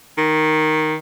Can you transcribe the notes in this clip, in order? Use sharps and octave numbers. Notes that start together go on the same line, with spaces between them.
D#3